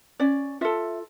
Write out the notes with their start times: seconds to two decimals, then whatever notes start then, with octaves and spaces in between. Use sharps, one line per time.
0.20 C#4 D5
0.61 F4 A4 E5